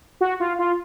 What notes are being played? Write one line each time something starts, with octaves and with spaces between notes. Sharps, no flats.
F#4
F4
F4